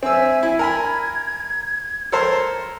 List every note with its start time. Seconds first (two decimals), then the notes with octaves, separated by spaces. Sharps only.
0.03 C4 E5 G#5 E6
0.43 E4 G#6
0.59 A#4 G#5 B5
2.12 A4 A#4 C5